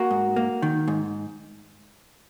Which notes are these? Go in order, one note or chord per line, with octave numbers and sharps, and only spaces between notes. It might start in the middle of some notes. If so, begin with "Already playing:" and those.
Already playing: A#3 F#4 A#4
G#2
A#3
D#3
G#2